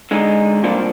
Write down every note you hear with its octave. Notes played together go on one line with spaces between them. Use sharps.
D3 G#3 D#4
C2 A#2 F3 A#3 D4